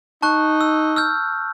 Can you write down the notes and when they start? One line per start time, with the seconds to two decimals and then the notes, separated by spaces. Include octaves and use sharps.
0.22 D#4 A5 C#6 F#6
0.61 E6
0.96 E6 F6 G6